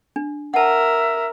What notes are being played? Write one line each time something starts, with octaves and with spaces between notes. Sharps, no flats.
D4
A#4 E5 F#5 A5